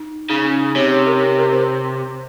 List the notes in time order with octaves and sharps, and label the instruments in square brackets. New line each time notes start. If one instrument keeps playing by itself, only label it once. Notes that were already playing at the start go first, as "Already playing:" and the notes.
Already playing: [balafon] D#4
[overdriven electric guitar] C#3 [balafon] D#4
[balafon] C#4
D#4
[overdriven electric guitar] C3 [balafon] C#5
[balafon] C#5
A#4
A#4
C5